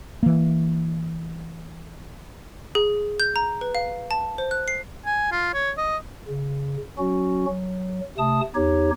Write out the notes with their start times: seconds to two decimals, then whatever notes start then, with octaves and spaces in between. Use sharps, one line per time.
0.23 E3 A#3
2.75 G#4
3.20 G6
3.36 A#5
3.61 B4
3.75 F5
4.11 A5
4.38 C5
4.51 F#6
4.68 C7
5.06 G#5
5.32 F4
5.54 C#5
5.78 D#5
6.28 C#3
6.98 F#3 C#4 F#4
7.48 F#3
8.18 C3 A3 A5 D#6
8.55 E2 D#4 G4 C#5